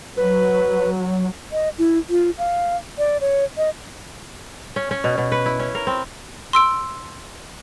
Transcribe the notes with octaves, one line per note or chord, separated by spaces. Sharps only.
F#3 B4
D#5
E4
F4
F5
D5
C#5
D#5
C#4
C#4
B2
B2
B4
E4
C#4
A#4
C4
C6 E6 D7